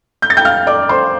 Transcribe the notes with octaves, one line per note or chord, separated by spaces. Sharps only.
G6
A6
G5 G6
F5 F6
D5 D6
C5 C6